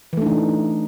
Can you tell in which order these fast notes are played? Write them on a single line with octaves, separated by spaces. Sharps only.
E3 A3 D4 D#4